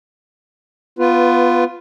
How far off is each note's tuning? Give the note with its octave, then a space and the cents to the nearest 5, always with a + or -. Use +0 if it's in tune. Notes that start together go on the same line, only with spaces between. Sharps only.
B3 +0 F4 +0 B4 +15